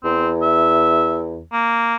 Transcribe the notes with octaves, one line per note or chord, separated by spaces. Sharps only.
E2 C4
E5
A#3